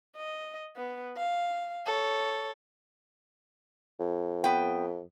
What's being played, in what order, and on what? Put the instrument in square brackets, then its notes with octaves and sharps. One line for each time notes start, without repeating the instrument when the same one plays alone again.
[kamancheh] D#5
B3
F5
A4 C#5
[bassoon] F2
[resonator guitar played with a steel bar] B3 G5